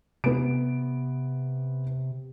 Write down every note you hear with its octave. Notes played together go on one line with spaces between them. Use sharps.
C3 B3 D7